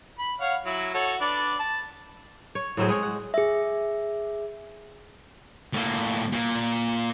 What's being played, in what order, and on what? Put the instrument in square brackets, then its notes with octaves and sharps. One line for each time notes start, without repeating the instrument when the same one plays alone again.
[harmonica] B5
C#5 F5 F#5
F#3 E4
F#4 A4 C#5
D4 B4 D5
A5
[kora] C#5
A2 F#3 C4 G#4
G#3 G#4 C#5
F#5
[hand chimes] G#4 E5
[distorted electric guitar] A2 A#3
A#2 A#3